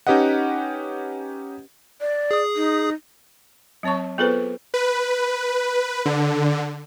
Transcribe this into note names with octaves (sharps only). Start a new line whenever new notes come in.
C#4 D#4 G4 B4 D#5 F#5
D5
G#4 D#6
D#4
F#3 C4 C#5 A5 C#6
B3 F4 G#4 A4 B4 C5
B4
D3